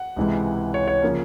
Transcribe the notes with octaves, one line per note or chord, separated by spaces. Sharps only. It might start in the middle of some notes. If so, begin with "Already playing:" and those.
Already playing: F#5
C#2 C3 E3 G#3
C#5
C#5
C#3 F3 A#3 C#4